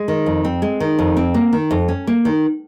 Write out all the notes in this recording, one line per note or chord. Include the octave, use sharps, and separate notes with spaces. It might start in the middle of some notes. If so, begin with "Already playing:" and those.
Already playing: G#3
D#3
F2
C4
G#3
D#3
F2
C4
A#3
D#3
F2
C#4
A#3
D#3